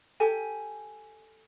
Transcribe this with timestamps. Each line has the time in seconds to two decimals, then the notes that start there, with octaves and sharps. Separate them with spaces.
0.20 G4 A4 G#5